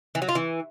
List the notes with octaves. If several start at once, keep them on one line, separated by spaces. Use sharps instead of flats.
E3
F#3
F4
E3